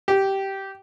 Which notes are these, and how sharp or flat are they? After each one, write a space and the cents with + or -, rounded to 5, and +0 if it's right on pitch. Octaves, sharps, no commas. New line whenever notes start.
G4 -10